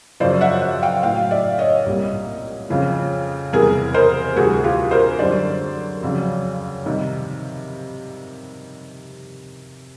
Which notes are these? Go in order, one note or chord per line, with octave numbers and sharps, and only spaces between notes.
F#2 C#3 F3 C5 D5
E5 F#5
E5 F#5
F5 G5
A2 F#3 F5 G5
D5 E5
C#5 D#5
C2 A#2 G3
F2 C#3 F3
E2 C3 E3 G3 G#4 A#4
A#4 C5
D2 C3 E3 G3 F#4 G#4
F4 G4
A#4 C5
F#2 D3 G3 C5 D5
F2 C#3 F#3
C3 D#3 G3